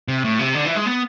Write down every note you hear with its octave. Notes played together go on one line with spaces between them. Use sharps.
C3
A2
C3
D3
E3
G#3
B3